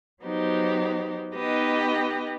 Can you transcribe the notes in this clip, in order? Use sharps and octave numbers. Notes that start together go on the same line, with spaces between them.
F#3 B3 D#4 G4 C5
B3 D#4 G4 B4 D#5